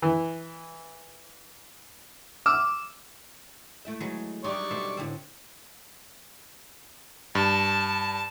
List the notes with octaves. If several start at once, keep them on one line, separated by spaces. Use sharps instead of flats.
E3
D6 E6 F6 E7
A3 E4 E5
F#3 G#3 B4
G3 D4 D#4 D5 C#6
B2 A3 C5
A2 D3 C4
G2 A5